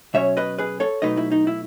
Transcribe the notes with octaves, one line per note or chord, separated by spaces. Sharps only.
B2 F#3 C#4 C#5 E5
B4 D#5
G#4 B4
A4 C#5
B1 B2 F#3 A3 D#4 B4 D#5
E4
D#4
E4